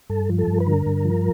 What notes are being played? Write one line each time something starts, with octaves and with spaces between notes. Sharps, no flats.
G2 A4
F3
A4
G2
B4
D3 A#4
G2
F3